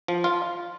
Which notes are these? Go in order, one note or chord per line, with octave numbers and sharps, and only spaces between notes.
F3
F4